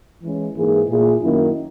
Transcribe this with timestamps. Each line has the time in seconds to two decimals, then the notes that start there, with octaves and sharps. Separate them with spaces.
0.21 E3 G#3 C#4
0.54 G#2 E3 A#3 E4 G#4
0.88 A#2 A#3 E4 G#4
1.21 F#2 D#3 A#3 E4